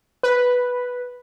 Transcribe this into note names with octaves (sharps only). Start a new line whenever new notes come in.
B4